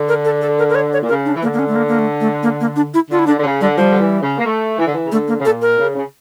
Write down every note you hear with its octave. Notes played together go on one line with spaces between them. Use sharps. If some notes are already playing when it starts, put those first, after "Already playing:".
Already playing: D3
A#4
A4
A4
A#4
A#4
C#5
C#5
A#2
C#3 A#4
D4
E3
D3 A#3
A#3
C#4
A3
A#3
A#3
A3
A3
A#3
A#3
D4
E4
D3 F4
E4
D3 D4
D3
C#3
D3 G3
F3 G3
D3
E3
C#3
A#3
A3
E3
D3
E3
C#3
D3 A3
A#3
C#3
A#2 A4
A#4
C#3
C#3